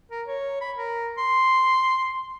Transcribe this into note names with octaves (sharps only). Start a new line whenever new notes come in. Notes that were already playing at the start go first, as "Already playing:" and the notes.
A#4
C#5
B5
A#4
C6